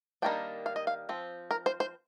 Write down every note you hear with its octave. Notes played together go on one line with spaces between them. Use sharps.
D#3 G3 A#3 D4 G5
F5
D#5
F5
F3 C4
A#4
C5
C5